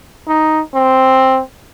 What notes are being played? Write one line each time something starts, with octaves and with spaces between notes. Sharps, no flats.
D#4
C4